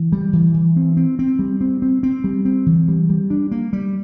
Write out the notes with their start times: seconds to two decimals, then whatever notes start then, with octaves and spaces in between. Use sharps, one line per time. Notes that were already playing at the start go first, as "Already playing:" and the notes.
Already playing: E3
0.12 G3
0.33 E3
0.54 E3
0.76 C4
0.97 C4
1.19 C4
1.39 G3
1.61 C4
1.82 C4
2.03 C4
2.24 G3
2.45 C4
2.66 E3
2.88 G3
3.09 G3
3.30 D4
3.52 A#3
3.73 G3